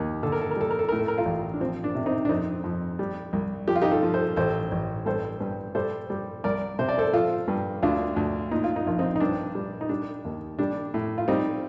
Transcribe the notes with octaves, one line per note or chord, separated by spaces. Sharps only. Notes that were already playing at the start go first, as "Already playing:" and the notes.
Already playing: D#2
D3 A4
A#4
A4
A#4
G3 A4
A#4
A4
A2 A#4
A4
A#4
F4 A4
A1
D4
F3 C4
D4
C3
C4 D#4
D4
F2 C4 D#4
F2
G3
C2
F3 G4
F4
D#4 G4
F4 A4
F3
A4 C5
A1 A4 C5
A1
G2 A4 C5
G2
G3 A4 C5
G3
C2 A#4 D5
C3 C5
D5
A4 C5
F3 F4 A4
G2
D2 D4 F4
D2
A#2 D#4
F4
D#4
A#1 F4
C4 D#4
D#4
G2 D4
G3
D#4
G3 D4
D#2
G3 D4
A2
F4
G3 C4 D#4